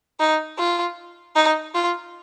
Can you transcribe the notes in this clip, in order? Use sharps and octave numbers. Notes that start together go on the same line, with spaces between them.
D#4
F4
D#4
F4